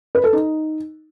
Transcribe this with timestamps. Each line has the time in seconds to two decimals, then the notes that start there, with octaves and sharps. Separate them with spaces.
0.15 B4
0.24 A4
0.33 D#4